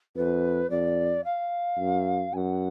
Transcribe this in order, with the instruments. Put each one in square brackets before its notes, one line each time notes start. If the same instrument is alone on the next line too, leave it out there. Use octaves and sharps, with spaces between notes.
[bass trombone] F2 [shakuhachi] B4
[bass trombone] F2 [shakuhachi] D5
[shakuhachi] F5
[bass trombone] F#2
[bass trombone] F#2 [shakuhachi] G#5
[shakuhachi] F#5